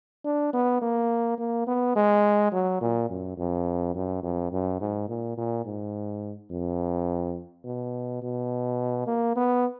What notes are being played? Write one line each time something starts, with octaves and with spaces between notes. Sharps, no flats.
D4
B3
A#3
A#3
B3
G#3
F#3
A#2
F#2
F2
F#2
F2
F#2
G#2
A#2
A#2
G#2
F2
B2
B2
A#3
B3